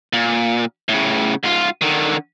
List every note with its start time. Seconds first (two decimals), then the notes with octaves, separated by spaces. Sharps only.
0.13 A#2
0.89 A2 C#3
1.43 G#2 F4
1.81 D3 D#3